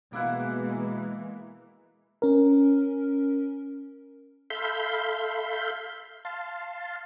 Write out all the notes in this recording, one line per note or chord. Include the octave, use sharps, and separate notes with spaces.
B2 E3 G#3 A#3 E4 F#5
C#4 A#4
A4 E5 F5 B5 C6 G6
F5 A5 C6